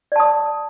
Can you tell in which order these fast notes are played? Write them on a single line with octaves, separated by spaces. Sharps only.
D5 A5 D#6